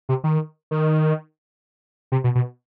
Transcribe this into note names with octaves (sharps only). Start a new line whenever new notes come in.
C3
D#3
D#3
C3
B2
B2